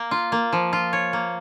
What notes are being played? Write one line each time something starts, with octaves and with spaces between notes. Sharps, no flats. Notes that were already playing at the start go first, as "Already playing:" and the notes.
Already playing: A#3 A#4
F4
A#3
F3
F4
C#5
A#3